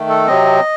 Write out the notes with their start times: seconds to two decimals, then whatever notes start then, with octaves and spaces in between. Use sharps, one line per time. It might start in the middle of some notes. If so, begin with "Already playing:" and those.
Already playing: D#3 A3
0.09 A4
0.27 C3 F#3 C4 D#5